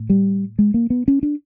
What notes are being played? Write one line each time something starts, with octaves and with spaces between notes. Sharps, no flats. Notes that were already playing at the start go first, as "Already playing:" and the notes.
Already playing: A2
G3
G#3
A#3
B3
C#4
D4